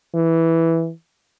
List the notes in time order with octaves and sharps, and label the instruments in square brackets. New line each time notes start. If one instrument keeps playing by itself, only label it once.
[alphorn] E3